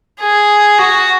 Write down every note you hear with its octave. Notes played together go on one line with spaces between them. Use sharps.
G#4
F#4